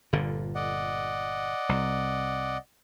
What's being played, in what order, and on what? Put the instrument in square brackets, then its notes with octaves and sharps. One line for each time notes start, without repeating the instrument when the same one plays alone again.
[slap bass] G1 A#2 D3
[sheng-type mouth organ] D5 D#5 F#5
[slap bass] C2